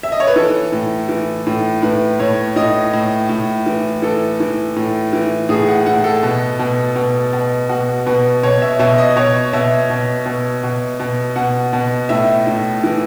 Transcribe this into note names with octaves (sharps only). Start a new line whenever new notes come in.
E5
D#5
C#5
B4
E3 A4
A2
E3
A2
A2 B4
A2 C#5
A2 D#5
A2
A2
E3
E3 A4
E3
A2
E3
A2 G#4
F#5
A2 F#5
A4
B2
B2
B2
B2
B2 F#4
B2 B4
B2 C#5
E5
B2 E5
D#5
B2 C#5
B2 E5
B2
B2
B2
B2
B2 F#5
B2
A2 E5
A2
E3